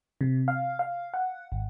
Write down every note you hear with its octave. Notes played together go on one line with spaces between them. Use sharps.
C3
F5
F5
F#5
G#1